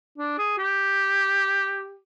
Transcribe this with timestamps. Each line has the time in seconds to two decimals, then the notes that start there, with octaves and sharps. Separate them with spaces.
0.18 D4
0.38 G#4
0.58 G4